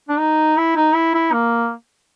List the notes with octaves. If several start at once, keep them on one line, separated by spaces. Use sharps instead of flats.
D4
D#4
E4
D#4
E4
E4
A#3